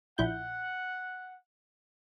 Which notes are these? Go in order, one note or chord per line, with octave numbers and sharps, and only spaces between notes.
A#1 E4 F#5 G6